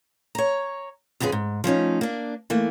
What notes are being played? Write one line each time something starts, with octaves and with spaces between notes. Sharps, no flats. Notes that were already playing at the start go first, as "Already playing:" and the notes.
C#5 A#5
F2 D3 B3 C#4 G#4
G#2
F3 A3 C#4 D#4
A#3 D4
E3 A3 A#3